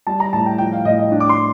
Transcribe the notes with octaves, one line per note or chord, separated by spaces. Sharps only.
G3 A5
A#5
A2 A5
G5
F3 G5
F5
A2 D#5
D#5
D4
D6
C6